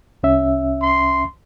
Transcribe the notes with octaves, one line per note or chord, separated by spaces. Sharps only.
C2 C#4 E5
C6